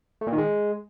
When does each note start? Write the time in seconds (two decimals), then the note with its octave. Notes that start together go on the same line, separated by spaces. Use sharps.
0.21 A3
0.27 A#2
0.32 D#3
0.38 G#3